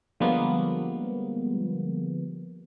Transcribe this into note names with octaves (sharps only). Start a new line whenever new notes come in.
D3 F3 G3 G#3 A#3 B3